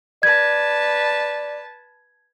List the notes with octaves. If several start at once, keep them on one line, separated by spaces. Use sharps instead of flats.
B4 D5 A5 G#6